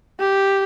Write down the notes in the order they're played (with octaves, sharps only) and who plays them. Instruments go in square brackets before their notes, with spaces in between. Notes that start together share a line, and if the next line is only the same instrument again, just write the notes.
[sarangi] G4